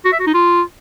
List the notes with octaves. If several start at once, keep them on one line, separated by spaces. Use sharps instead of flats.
F#4
E5
F#4
D#4
F4